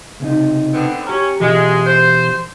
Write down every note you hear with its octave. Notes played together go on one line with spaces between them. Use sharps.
C#2 C3 D#4
D3 B3 C4
C#4 G4 A#5
B2 E3 G#3 G4
C5